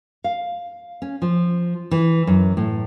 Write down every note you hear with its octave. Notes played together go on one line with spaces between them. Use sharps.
F5
C#4
F3
E3
F#2
A2